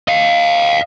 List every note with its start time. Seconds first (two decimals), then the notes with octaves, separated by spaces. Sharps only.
0.08 D#5 F5